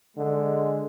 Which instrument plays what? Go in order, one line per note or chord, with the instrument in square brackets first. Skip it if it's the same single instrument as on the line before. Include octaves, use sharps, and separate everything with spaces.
[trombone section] D3 G#3